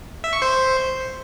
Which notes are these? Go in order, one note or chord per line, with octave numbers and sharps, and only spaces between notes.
E5
C#6
C5